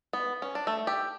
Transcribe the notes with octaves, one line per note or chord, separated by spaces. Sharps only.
B3
C#4
D4
A3
G4